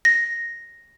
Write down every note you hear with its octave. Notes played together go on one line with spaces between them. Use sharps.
A#6